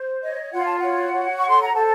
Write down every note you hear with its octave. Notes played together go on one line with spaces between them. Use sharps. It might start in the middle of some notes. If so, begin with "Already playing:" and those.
Already playing: C5
C#5 D#5
F4 F#5
A5
F#4 C#5 F#5
C#5
C#6
A4
C6
A#5
A4 C5 A5